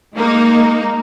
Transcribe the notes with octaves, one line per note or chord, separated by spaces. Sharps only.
G#3 A#3 D#4